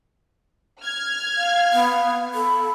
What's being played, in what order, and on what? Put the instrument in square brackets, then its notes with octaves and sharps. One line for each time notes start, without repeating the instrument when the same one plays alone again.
[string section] F6 G#6
[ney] F5
[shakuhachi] B3
[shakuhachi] A4 [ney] B5